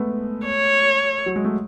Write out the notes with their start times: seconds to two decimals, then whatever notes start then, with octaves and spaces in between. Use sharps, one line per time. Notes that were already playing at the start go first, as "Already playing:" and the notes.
Already playing: G#3 A3 B3
0.47 C#5
1.26 F#3
1.36 G#3
1.45 A3